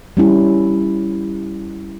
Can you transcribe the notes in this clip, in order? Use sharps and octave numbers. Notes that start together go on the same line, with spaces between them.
G3 C#4 E4